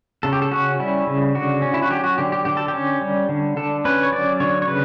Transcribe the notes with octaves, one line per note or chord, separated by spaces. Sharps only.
C#3 A4
G4
A4
C#4 F#4
G3 E4
C#3
D3 F#4
C#4
E4
F#4
F#3 G4
F#4
D3 G4
G4
D3 G4
A4
G4
C#4
G3
D3
D3 A4
C#4 B4
C#5
F#3 D5
D3 C#5
C#5
C#3 B4